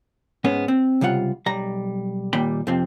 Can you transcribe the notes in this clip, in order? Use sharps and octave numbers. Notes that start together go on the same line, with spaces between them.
G#2 G#3 B3 C#4
C4
C#2 C3 G3 F4 F#5
B1 G3 A#5
D#2 A#2 D#3 G3 G5 B5
F2 C3 F3 C4